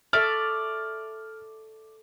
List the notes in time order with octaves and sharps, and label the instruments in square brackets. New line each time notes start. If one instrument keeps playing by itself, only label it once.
[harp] A4 E5 C#6 [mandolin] D5 [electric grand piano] F6